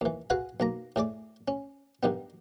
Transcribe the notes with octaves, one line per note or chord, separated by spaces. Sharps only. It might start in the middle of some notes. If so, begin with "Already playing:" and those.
D#2 E3
F#4 G#4 B4 F5 G#5
B1 A#3 A#5
A2 G#4 D5 D6
C#4
G2 D#3 G3 B3